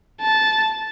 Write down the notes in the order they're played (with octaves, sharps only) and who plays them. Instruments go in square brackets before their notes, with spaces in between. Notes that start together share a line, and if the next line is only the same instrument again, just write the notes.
[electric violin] A5